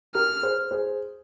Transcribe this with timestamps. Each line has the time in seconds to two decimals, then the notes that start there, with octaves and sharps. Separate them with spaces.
0.15 G4 A#4 F6
0.43 G#4 C5
0.71 G#4 C5